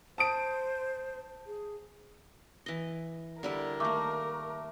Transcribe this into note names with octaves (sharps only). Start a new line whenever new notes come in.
C5 A5 D#6 D7
G#4
E3 D#5
D3 G3 E4 A#4
D#3 A3 A#3 D6